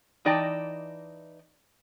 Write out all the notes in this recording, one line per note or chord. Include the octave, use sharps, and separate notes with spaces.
E3 D#4 D5 D#5 G5 A5